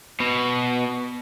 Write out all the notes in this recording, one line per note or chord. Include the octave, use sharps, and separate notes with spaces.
B2